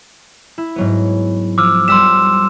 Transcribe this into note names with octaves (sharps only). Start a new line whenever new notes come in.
E4
G#2 F#3 B3
F3 D6 E6 F6
G3 C6 E6 B6 E7